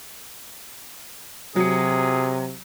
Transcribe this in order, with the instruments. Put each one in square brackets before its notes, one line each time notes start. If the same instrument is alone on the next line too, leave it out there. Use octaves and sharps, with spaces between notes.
[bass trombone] C3 [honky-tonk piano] F#3 C#7 [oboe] G#4